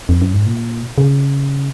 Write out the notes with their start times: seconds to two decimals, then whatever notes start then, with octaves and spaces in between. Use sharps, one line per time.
0.09 F2
0.22 F#2
0.34 G#2
0.47 A#2
0.98 C#3